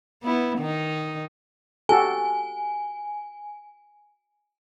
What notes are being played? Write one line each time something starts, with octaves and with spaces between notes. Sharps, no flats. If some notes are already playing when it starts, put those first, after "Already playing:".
B3 E4
D#3 D#4
F#4 G4 A4 G#5